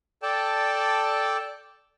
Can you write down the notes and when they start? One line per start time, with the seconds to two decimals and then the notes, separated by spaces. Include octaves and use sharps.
0.22 A4 D5 G5 A5